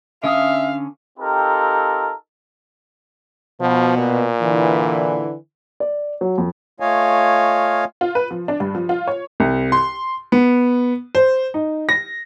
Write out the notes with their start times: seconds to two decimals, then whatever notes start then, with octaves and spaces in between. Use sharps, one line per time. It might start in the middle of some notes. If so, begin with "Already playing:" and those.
0.24 D3 C#4 E5 F5 D#6
1.19 C4 D#4 F4 G4 A4 A#4
3.60 B2 F3
3.98 A#2
4.40 D3 E3
5.80 D5
6.21 F#3
6.38 F2
6.80 A3 F4 C#5 D#5 F5 G#5
8.01 F4
8.15 B4
8.31 F3
8.48 D4
8.60 G2
8.75 F3
8.89 F4
9.08 C#5
9.40 C2
9.72 C6
10.32 B3
11.15 C5
11.54 D#4
11.89 A#6